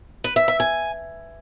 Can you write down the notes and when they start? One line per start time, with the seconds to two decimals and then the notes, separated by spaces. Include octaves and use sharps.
0.24 B4
0.36 E5
0.48 E5
0.60 G#5